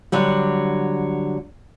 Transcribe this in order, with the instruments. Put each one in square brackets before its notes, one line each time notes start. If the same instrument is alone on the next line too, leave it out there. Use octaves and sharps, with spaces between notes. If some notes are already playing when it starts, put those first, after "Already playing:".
[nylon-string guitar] D3 F#3 G3